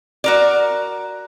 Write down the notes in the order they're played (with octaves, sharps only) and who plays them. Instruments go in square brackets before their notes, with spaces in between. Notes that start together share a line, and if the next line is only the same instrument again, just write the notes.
[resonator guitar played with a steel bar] F#4 A#4 D5